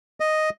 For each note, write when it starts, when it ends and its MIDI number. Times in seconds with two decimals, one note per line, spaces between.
0.20 0.50 75